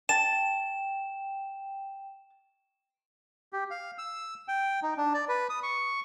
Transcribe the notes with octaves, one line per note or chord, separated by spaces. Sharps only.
G5 A5 E7
G4
F5
E6
G5
D#4
D4
D5
B4
D#6
C#6